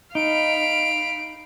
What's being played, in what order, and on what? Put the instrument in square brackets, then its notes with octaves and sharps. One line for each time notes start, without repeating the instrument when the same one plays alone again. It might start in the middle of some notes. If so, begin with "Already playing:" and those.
[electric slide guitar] D#4 [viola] F5 B5 [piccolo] D7